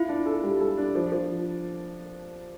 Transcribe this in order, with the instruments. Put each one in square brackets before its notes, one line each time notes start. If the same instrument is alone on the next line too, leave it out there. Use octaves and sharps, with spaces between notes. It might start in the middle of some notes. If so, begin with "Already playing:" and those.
Already playing: [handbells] E4 [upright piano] F4
[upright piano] D4
A4
G3
A4
D4
F3
F3